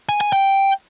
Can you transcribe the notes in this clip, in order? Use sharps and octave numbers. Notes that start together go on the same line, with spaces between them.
G#5
G#5
G5